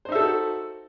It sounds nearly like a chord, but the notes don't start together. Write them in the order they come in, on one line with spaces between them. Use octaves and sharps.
C5 D#4 E5 A4 F#4